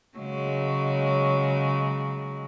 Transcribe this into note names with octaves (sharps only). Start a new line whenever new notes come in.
C#3 F#3 G#3